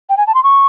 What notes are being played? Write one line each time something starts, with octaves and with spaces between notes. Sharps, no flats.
G5
G#5
A5
C6
C#6